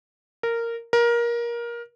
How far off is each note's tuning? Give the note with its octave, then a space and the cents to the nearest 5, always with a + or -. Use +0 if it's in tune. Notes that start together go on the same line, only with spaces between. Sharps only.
A#4 -10
A#4 +20